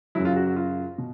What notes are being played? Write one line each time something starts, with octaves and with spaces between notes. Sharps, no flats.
F#2 C#3 F#3 E4
F4
F#4
F#4
F4
B2